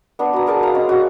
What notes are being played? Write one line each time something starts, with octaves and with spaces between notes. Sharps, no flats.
B3 D4 B4
F#4 A#5
G#4 A#4 D5 A5
F5 A#5
G#3 C#4
F#4